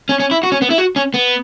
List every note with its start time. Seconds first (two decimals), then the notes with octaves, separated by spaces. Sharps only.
0.09 C#4
0.20 C#4
0.31 E4
0.43 F#4
0.52 C#4
0.62 B3
0.70 E4
0.78 F#4
0.96 C#4
1.14 B3